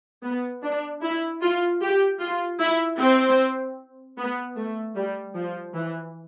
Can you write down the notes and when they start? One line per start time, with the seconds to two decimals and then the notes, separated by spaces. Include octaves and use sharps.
0.23 B3
0.62 D4
1.02 E4
1.41 F4
1.81 G4
2.20 F4
2.59 E4
2.99 C4
4.17 B3
4.56 A3
4.95 G3
5.35 F3
5.74 E3